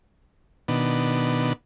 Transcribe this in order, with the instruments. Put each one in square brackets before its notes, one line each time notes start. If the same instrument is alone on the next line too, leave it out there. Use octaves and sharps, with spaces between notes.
[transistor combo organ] B2 D#3 B3 D4